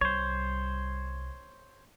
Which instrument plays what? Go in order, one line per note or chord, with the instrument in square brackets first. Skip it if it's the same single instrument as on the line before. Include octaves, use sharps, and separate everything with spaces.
[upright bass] C2 G3 [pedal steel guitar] C5 C#5